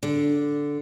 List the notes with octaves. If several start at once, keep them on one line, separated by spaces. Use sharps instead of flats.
D3